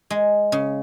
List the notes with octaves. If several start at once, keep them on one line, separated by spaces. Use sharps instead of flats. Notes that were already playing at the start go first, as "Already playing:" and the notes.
G#3
C#3